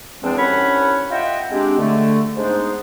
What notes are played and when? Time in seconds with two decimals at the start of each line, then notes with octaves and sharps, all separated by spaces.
0.23 E2 F3 G#3 C4 D4
0.37 C2 C#4 D4 C#5 F#5 B5
1.11 F4 D#5 E5 F#5 G5
1.51 G#3 C4 D4 G4
1.78 D3 A3
2.36 G#2 G#3 B3 D4 D#4 C5